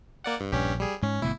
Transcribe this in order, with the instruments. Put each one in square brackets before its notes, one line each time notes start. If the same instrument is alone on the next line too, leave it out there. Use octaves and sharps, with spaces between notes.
[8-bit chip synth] A#3 D5 F#5
G2
[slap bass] A#1 [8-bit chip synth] G2 C#4 G4
[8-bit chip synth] G3 G#4
[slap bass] G#2 [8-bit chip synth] C#4
[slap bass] G1 B2 A3 [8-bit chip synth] E4